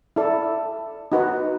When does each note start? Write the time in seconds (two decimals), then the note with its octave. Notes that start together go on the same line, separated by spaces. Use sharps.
0.16 E4 A4 D5
1.12 D#4 F#4 B4